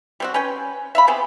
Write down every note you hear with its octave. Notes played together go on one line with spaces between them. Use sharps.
G3 C4 F#4
C#4 B4 G5
E5 F5 B5
B3 C4 G4 G#4